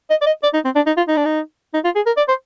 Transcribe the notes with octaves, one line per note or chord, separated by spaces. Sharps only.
D#5
D5
D#5
D5
D#4
C4
D4
D#4
F4
D#4
D4
D#4
D#4
F4
G#4
A#4
D5
C5